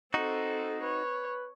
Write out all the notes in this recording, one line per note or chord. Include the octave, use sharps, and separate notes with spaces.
C4 D#4 F#4 A4
B4 C#5